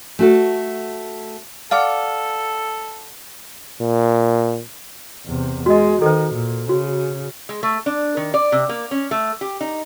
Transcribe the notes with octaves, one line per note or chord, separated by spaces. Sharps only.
A3 F#4 A4
A4 D5 F5 F#5 D6
A#2
E2 C3
G#3 F#4 D#5
D#3 A4 C5
A#2
C#3 F#4
G#3
A3
D4
D#3
D5
C3
A#3
C#4
A3
G4
D#4